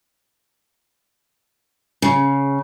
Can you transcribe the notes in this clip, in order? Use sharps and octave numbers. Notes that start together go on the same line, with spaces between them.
C#3